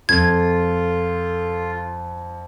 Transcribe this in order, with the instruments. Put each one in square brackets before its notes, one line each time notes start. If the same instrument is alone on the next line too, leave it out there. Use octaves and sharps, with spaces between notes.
[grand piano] F2 [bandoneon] F4 [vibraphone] A4 [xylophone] G#6